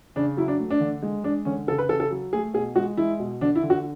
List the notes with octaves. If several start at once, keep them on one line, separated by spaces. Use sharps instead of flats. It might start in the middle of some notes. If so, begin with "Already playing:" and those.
C#3 D4
F#3 E4
D4
A3
D4
D3
G#3
G#3 D4
D3 C#4
C#3 A4
B4
C#3 A4
A4
F#3
A3 G#4
B2 G#4
G#3 F#4
G#3 E4
B2
D3 D4
E4
D3
F#4